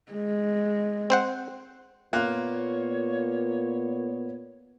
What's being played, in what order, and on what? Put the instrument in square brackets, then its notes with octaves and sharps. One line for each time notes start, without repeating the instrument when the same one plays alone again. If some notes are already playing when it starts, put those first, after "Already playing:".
[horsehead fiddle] G#3
[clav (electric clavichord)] C4 C5 F#5
[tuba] A#2 [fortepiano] A#3 F4 F#6 [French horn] B3 [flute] C#5